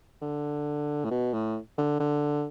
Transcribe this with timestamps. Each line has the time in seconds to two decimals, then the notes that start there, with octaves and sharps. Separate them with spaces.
0.22 D3
1.05 A2
1.11 B2
1.34 A2
1.78 D3
2.00 D3